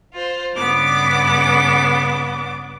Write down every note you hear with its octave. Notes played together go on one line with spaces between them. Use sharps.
F4 C5
G2 C#3 B3 D4 D6